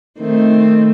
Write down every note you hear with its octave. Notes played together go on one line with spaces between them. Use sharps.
D#3 A3 C4